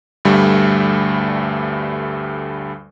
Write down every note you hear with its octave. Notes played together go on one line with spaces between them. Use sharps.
D2 G2 G3 A3